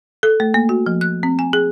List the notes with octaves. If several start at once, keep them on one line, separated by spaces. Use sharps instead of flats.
A4
A3
A#3
F#4
F3
F#6
C4
G#5
G#4